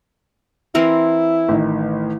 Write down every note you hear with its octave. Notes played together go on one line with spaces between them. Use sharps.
E3 C4 E4 A#4
A1 D#3